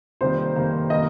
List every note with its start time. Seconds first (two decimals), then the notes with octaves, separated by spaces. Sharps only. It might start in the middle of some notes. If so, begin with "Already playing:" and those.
0.21 F1 F2 D#3 G3 A#3 C5
0.56 F1 F2 D#3 G3 A#3
0.90 D#3 G3 A#3 D#5